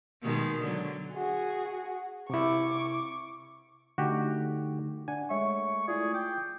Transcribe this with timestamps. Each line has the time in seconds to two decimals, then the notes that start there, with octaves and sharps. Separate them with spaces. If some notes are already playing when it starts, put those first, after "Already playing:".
0.23 B2 D#3 G#3
0.63 D3 F#3
1.14 F#4 G#4
2.30 C3 E4 C#6 D6
3.98 D3 A3 D#4 F#4 G4
5.08 D4 F#5 G#5
5.30 G#3 A3 C#5 E5 C#6
5.88 A3 E4 F4 G#4 D5
6.14 G5 D6